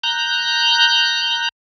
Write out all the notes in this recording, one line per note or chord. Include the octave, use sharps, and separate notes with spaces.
A#5 F#6 G6